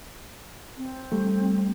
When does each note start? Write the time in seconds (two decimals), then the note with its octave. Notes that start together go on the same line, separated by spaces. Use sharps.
0.78 C4
1.12 G3 A3